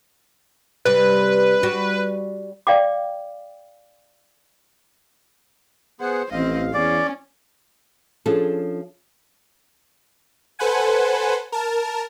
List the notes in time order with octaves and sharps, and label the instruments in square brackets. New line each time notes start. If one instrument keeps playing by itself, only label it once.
[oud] C3 G3 [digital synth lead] B4
[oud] G3 F#4
[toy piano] D5 F5 G5 D6
[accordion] B3 G#4 F#5 [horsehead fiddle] C5
[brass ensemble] A1 [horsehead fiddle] C4 D#5 [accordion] F5
[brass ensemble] E2 [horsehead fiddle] C#4 [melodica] D5
[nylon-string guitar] F3 C#4 D4 G#4 A4
[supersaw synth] A4 B4 C5 F#5 G#5
A#4 A5